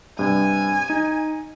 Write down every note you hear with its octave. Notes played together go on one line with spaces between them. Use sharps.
G2 C3 G#5
D#4